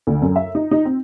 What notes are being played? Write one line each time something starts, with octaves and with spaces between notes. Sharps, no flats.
D2
F#2
E5
D#4
D#4
C4